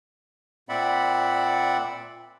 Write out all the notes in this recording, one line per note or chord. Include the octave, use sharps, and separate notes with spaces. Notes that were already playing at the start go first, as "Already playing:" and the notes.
A#2 C4 D5 E5 F#5 B5